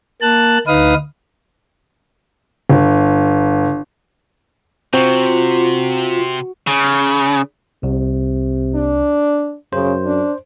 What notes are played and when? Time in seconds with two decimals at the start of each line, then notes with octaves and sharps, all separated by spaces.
0.22 A#3 A5 F#6
0.67 D2 D#4 B4 F5 D#6
2.70 G1
4.93 C3 C4 F4 F#4
6.67 C#3
7.83 C2 C3
8.75 D4
9.73 F#2 C#3 C5
10.05 D4